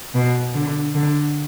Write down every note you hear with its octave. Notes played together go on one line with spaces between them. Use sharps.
B2
D3
D3